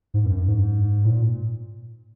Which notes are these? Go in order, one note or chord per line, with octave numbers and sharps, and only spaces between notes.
G#2
F#2
F#2
G#2
A#2